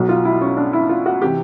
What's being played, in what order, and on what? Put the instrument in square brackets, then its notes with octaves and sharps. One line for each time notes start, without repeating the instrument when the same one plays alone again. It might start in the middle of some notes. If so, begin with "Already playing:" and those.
Already playing: [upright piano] B1 B2 F#3
F4
E4
C#4
D4
E4
F4
F#4
C3 E3 G4